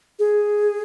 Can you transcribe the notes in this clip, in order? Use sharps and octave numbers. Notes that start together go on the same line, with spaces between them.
G#4